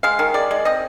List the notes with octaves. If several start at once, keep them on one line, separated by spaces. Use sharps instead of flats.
G#3 F5
D#3
G#3 D5
G#3
C4 D#5